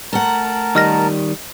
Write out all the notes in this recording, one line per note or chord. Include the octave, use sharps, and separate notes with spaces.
A3 A#4 F#5 A5 A#5
D#3 G3 D#5 F6 A#6